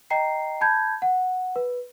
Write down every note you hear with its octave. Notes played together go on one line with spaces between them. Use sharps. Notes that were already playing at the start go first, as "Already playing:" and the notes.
D#5 G5 A#5 C7
A5 B5 G6 G#6
F#5
B4